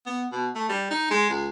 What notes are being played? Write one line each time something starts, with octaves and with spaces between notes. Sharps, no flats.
B3
B2
A3
G3
D#4
G#3
C#2